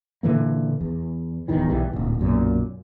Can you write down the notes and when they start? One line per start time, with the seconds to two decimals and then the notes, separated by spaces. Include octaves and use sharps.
0.23 A#2 D3 E3 A#3
0.81 E2
1.48 D1 E2 D#3 E3
1.68 B1 E3 G3
1.93 D1 A#2
2.19 B1 F#2 A#2